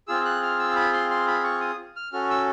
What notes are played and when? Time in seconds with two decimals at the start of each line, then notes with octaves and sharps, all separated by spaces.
0.08 C4 F4 G#4 E6
0.25 F#6
0.42 F6
0.59 E6
0.76 B5
0.93 C6
1.11 C6
1.27 B5
1.44 C#6
1.61 D#6
1.96 F6
2.12 C#4 F#4 A4 F6
2.30 E6